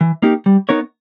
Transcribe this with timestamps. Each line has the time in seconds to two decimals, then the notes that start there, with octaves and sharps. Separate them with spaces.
0.01 E3
0.22 A#3 D#4 G4
0.46 G3
0.69 B3 D#4 A#4 C#5